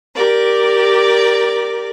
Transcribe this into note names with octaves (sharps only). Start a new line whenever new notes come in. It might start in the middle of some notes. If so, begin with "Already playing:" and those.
G4 A#4 D5